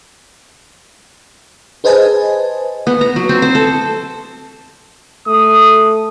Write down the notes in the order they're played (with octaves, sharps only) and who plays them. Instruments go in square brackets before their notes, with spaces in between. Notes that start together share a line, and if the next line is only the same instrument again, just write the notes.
[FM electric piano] G#4 B4 C5 D#5 G#5 A5
[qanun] B3
A#5
F#3
C4
C5
A4
[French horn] A3 [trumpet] D#6